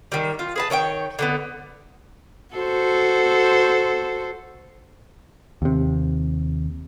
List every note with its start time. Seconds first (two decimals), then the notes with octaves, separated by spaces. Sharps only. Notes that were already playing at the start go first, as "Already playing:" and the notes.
0.12 D#3 G3
0.39 F4
0.56 G#4 B4 A5
0.70 D#3 C#5 D#5 G5
1.19 D3 G3 B3
2.55 F#4 A4 C5
5.62 D#2 C3